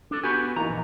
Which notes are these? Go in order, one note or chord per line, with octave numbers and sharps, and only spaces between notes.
D4 A4
B3 F#4 G4 G#5 B5 C#6
E3 A#3 D#4 A#5
A#1